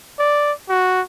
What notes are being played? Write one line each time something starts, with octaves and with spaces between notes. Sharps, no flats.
D5
F#4